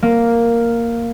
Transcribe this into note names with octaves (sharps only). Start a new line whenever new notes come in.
A#3